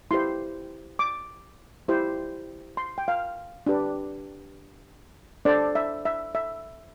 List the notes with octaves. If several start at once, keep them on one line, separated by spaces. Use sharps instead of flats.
E4 G4 C5 C6
D6
E4 G4 C5
C6
G5
F5
D4 G4 B4
D4 A4 C5 D5
E5
E5
E5